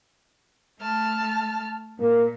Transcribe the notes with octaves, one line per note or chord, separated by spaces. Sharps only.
A3 A5 F6
A#2 A#3